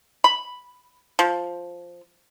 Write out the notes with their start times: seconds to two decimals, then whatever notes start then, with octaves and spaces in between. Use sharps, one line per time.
0.24 B5
1.19 F3